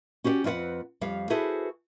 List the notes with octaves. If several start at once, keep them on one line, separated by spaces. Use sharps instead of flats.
C#4 F#4 G4 C5 D5
F2 C4 F4 B4 F#5
F2 G3 C#5 F5
E4 F#4 G#4 A4 B4 C5